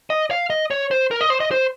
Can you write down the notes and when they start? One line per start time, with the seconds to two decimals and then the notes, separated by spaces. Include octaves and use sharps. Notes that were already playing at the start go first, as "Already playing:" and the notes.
0.10 D#5
0.31 F5
0.50 D#5
0.71 C#5
0.91 C5
1.11 A#4
1.21 D#5
1.30 C5
1.40 D#5
1.51 C5